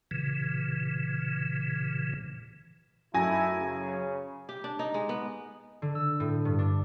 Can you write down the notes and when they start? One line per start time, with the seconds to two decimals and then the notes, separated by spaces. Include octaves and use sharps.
0.11 A#2 C#3 E3
3.14 F#2 A3 D#4 E4 G#5 A#6
3.60 C#3
4.49 G4
4.64 D4
4.79 D#4
4.94 G#3
5.09 B3
5.82 D3
5.95 E6
6.20 A2
6.45 G2
6.59 D4